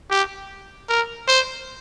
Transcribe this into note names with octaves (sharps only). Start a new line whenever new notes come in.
G4
A#4
C5